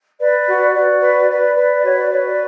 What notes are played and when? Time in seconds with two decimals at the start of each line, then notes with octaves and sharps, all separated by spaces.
0.19 B4 D5
0.47 F#4
0.74 F#4 D5
1.01 B4
1.29 B4 D5
1.56 B4
1.83 F#4 C#5
1.97 D5
2.10 B4 C#5
2.24 D5